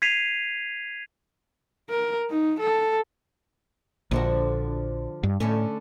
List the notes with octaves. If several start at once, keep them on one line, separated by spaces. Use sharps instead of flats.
G#6 B6 C7 D#7 F7
A#4
D#4
A4
A#1 D3 F3 F#4
G2
A2 D3 A3 C#4